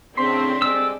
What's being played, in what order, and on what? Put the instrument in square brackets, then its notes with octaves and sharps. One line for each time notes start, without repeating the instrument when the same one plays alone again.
[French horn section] A2 C#3 [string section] C4 D4 [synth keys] C6 B6 C7
[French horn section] G3 G#3 D5 [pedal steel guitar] A4 E6